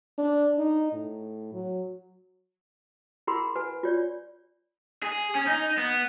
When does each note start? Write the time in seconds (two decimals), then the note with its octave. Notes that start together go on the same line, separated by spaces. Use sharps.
0.18 D4
0.58 D#4
0.93 A2
1.53 F#3
3.27 E4 G#4 A#4 F#5 B5 C6
3.56 B4 F#5 G#5
3.83 F4 C#5 D5
5.03 G#4
5.35 C#4
5.47 D#4
5.78 B3